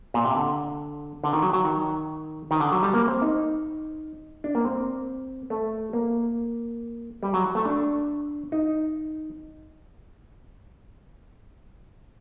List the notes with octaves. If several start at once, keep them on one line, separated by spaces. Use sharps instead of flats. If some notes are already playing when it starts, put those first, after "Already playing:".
A#2
C3
D3
D3
D#3
F#3
F#3
D#3
D#3
D3
F#3
G3
A#3
C4
D#4
D4
A#3
C4
A3
A#3
G3
F#3
A3
D4
D#4